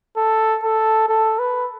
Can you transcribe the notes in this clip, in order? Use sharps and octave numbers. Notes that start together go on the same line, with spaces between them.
A4
A4
A4
B4